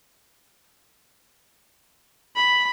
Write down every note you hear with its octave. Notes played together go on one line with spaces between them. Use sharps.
B5